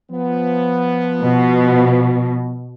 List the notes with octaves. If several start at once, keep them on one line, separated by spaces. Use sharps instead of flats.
F3 B3
B2